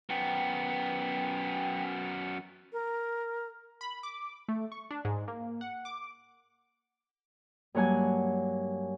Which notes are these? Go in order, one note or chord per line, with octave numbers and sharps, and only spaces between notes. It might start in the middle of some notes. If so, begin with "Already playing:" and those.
F#2 B3 G5
A#4
B5
D6
A3
C#6
D4
G#2
A#3
F#5
D6
G2 F#3 A#3 C#5 F#5 G#5